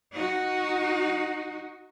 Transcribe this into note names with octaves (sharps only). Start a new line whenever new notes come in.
D#4 F#4